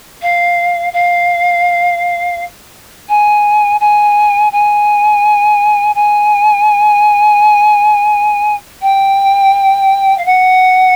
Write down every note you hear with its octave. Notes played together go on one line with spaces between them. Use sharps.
F5
F5
G#5
G#5
G#5
G#5
G5
F5
F#5